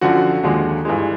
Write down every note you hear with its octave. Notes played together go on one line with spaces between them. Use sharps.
F#2 D3 F3 F#4 F#5
D#2 D3 F3 G#3
G2 E3 G#3